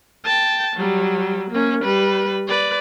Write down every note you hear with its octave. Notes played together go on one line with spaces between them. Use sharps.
G5 A5
F#3 G3
A#3 C#4
G3 B4
B4 D5